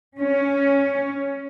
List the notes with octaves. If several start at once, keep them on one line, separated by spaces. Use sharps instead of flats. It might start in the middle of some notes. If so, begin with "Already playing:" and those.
C#4